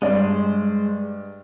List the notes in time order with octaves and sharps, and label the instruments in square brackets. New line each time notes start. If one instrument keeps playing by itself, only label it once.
[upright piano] G2 D5 [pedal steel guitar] G#3 C5